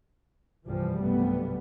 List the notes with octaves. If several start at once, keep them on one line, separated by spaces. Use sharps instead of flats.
C2 G2 E3 F3 G3
B1 G2 C3 G3 A3 B3